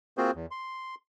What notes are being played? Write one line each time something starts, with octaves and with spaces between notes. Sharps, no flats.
A#3 C4 F4 F#4 G#4 C5
E2
C6